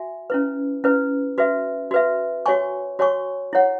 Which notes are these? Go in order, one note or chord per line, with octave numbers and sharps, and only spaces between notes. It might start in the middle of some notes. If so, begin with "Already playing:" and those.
Already playing: F#4 E5 G#5
C#4 E4 B4
C#4 E4 B4
F#4 B4 E5
F#4 B4 E5
F#4 C#5 G#5 C#6
F#4 C#5 G#5 C#6
E4 C#5 F#5